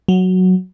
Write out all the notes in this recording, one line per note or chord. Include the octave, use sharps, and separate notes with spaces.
F#3